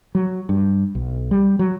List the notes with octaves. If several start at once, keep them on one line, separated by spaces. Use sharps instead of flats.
F#3
G2
B1
G3
F#3